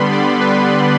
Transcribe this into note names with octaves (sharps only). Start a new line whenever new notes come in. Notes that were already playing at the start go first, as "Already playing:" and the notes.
Already playing: D3 G3 B3 B5 C6
D5
B4